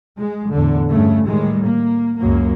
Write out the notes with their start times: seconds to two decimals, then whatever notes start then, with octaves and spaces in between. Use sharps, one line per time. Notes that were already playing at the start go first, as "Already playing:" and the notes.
0.16 G#3
0.52 E2 A2 D3
0.91 G2 C#3 A3
1.27 A2 D#3 G3 G#3
1.65 A#3
2.19 C#2 F#2 F#3 A#3